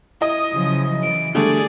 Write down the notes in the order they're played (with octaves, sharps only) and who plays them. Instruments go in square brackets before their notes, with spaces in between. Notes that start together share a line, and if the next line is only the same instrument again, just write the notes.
[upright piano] E4 D#5 [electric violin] D#6
[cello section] C#3 F3 F#3
[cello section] E3 [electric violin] D7
[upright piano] D3 G3 A3 [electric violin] G#4 D5